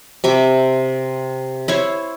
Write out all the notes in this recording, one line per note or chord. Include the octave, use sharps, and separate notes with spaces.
C3 E5 D6
E4 C5 C#5